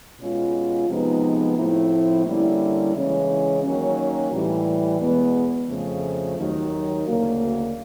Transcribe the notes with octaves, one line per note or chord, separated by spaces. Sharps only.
B2 G#3 C#4 F4
C3 F3 G#3 B3 D#4
A2 F3 A3 C4 E4
D3 G3 A#3 C#4 E4
C#3 E3 G#3 C#4
D#3 F#3 A#3 C#4
A2 E3 G3
E2 B2 G#3 B3
F2 C#3 F3 A3
D#2 D#3 F#3
D2 C#3 F#3 A#3